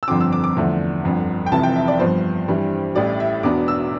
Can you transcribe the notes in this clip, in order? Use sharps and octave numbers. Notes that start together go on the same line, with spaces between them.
E6
G1 F2 D3 F3 C4 D6
E6
D6
D6
E2 D3 F3 A3 D4
G1 F2 D3
G5
F1 F2 C3 E3 A5
G5
E5
D5
G2 F3 B3 C5
G2 E3 G3 D4
A1 A2 G3 D5
E5
E1 E2 B2 B3 D4 D6
E6